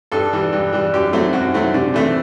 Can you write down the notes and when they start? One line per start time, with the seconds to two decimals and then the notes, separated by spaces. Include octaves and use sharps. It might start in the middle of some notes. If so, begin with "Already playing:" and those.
0.12 G2 A4
0.33 E3 G3
0.53 G2
0.73 E3 G3
0.94 F#2 G4
1.13 F#3 A3 C4
1.33 F#2 F#4
1.54 F#3 A3 C4
1.74 C3 D4
1.94 E3 A3 C4